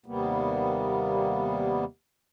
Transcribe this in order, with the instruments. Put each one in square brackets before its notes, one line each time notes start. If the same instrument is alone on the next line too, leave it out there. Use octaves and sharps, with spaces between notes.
[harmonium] D#2 C3 G3 A#3 B3